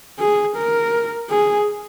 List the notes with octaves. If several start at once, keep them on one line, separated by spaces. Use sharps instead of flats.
G#4
A#4
G#4